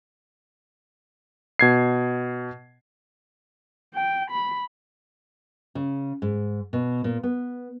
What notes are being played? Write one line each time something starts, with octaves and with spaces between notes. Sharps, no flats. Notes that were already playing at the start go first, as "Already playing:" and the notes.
B2 G#6 C7
G5
B5
C#3
G#2
B2
A#2
B3